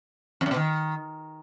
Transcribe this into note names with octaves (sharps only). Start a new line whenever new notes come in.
F2
F#2
B2
D#3